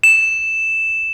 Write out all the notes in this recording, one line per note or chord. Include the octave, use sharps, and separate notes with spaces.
E7